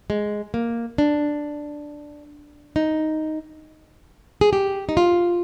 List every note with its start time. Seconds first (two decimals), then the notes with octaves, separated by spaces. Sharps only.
0.10 G#3
0.54 A#3
0.98 D4
2.76 D#4
4.41 G#4
4.53 G4
4.89 D#4
4.97 F4